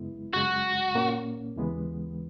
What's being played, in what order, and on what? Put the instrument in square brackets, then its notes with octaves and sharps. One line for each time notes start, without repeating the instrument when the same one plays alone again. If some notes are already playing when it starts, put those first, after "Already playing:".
Already playing: [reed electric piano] F#2 C#3 G#3 B3 E4
[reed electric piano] F#2 C#3 G#3 [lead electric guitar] F#4
[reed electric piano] A#2 A#3 C#4
D#2 C#3 E3 G#3 B3